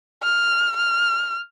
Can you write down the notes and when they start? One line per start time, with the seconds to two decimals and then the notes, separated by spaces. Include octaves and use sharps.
0.23 F6
0.77 F6